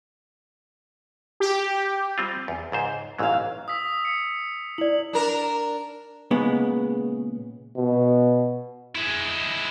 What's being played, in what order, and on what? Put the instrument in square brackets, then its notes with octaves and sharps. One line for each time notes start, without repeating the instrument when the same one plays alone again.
[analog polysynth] G4
[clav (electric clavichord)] G3 C4 F4
E2
C#2 G#2 C5
[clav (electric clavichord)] A1 G#2 F#3 [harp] F5 E6
[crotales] D#6 E6 B6
C#7
[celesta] E4 D5 [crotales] F#7
[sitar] D4 A#4
[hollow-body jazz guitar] A#2 C#3 G#3 B3
[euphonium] B2
[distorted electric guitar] G#3 E4